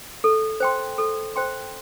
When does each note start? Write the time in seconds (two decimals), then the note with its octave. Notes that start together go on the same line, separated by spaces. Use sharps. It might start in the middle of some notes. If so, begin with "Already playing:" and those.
0.24 A4
0.60 C5 G5 C6
0.98 A4
1.36 C5 G5 C6